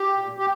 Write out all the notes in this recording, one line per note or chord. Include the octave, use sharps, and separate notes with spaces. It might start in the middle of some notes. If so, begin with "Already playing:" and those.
Already playing: G4
A#2
G4